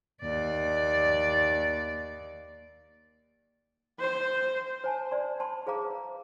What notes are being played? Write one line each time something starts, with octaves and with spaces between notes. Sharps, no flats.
D#2 D5
C5
C5 G#5 A5
C5 D5 C6
C5 A5 B5 C6
G#4 C5 F5 A#5 D6
B4